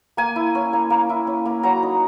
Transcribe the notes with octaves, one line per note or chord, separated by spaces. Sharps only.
A#3 G#5
E4
C#4
A#3
A#3
E4
C#4
A#3
F#3 A#5
D#4